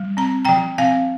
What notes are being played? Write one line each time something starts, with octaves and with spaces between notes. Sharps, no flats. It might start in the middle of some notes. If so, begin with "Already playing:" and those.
Already playing: G3
C4 A#5
F3 G5 A#5
C4 F5 G#5